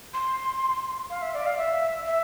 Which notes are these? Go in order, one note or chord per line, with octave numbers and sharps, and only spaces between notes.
C6
F5
E5
D5
F5
E5
E5